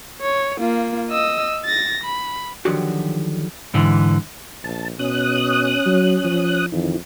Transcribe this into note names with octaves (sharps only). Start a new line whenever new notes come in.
C#5
A#3 F4
D#5 E6
A6 A#6
B5
D3 D#3 F3 F#3 F#4 G4
G#2 D3 E3
A#1 A5
B2 C#4 D#6 F#6
F#3
F3
F2 D#3 E3